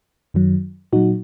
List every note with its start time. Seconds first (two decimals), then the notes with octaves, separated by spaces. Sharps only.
0.34 F#2 D#3 F#3
0.92 A#2 F#3 D#4 F#4